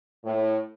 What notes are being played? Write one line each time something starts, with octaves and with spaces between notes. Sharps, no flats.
A2